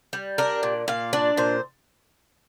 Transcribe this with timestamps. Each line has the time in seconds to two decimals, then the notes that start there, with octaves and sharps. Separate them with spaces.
0.13 G3
0.38 D4 A#4
0.63 A#2
0.88 A#2 F5
1.13 D4 D5
1.37 A#2 C5